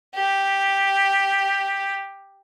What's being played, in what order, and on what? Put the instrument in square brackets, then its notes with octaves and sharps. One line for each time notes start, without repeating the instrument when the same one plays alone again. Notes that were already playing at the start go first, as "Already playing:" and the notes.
[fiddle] G4